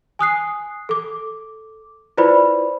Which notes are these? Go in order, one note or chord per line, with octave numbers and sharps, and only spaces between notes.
G#5 D#6 F#6 C7
A4 D6
E4 F4 B4 C5 D5 B5